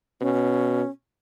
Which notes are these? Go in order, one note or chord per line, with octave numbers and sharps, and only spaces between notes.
B2 C#4